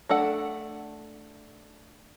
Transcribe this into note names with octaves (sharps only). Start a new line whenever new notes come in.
A3 D4 A4 F#5